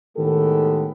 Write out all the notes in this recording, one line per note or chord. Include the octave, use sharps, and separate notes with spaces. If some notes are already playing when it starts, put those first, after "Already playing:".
A2 D#3 G#3 B3 G4 A4